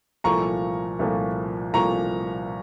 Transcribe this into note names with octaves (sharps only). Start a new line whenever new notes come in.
C2 A#2 F3 A3 A#5 C#6
C2 A#2 F3 A3
C2 A#2 F3 A3 A#5 C#6